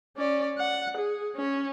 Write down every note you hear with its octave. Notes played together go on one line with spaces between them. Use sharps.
C#4 D5
F#5
G#4
C#4